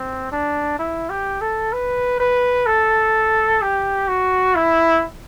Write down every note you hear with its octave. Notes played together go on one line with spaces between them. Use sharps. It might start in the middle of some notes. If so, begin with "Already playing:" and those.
Already playing: C4
D4
E4
G4
A4
B4
B4
A4
G4
F#4
E4